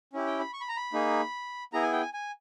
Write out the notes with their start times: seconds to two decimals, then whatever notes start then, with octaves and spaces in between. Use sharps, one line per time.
0.13 C#4 E4 G4
0.27 G5
0.39 B5
0.53 C#6
0.61 B5
0.69 A#5
0.77 B5
0.93 A#3 D#4 G#4
1.73 B3 E4 G#4 A#5
1.83 G#5
1.92 G5
2.02 G#5
2.13 G#5